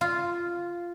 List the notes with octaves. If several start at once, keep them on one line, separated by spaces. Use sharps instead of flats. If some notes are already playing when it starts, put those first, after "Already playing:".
F4